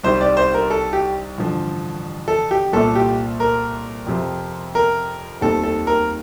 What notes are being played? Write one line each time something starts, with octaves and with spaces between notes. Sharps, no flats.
C2 C3 D#3 G3 C5
D5
C5
A#4
A4
G4
A1 G2 D3 F3
A4
G4
C2 A#2 A3 A4
G4
A#4
F2 C3 F3
A#4
F1 D#2 D#3 G3 C4 A4
A4
A#4